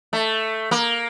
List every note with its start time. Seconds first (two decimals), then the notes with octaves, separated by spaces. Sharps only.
0.13 A3
0.71 A#3